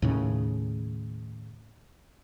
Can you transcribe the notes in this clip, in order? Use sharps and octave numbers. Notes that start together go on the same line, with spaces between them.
D#2 A2 C#3